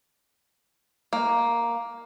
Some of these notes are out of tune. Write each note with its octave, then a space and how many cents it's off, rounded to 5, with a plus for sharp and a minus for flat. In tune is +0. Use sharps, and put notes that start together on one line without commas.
A#3 +5